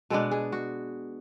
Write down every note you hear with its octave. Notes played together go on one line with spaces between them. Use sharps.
B2 G#3 B3 D4 A4
G#4
F#4